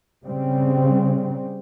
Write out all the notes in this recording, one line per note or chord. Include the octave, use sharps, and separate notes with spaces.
C#3 G3 C4